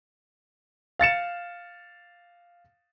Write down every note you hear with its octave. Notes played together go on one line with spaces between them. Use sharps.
F5 A6 C#7 E7